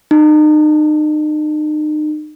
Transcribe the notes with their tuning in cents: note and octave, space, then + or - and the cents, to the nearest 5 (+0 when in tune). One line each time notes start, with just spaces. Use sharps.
D#4 -35